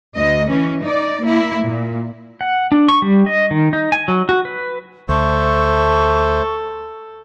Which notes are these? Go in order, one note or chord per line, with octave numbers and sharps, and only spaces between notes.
D2 D#5
E3 C#4
D#4 D5
A#3 E4
A#2
F#5
D4
C#6
G3
D#5
D#3
D#4
G#5
F#3
F#4
B4
D2 A3 A4 C5 C#6